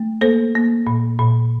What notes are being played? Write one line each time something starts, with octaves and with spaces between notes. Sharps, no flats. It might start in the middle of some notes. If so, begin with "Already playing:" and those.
Already playing: A3
A#3 A4 C5
A#3
A#2
A#2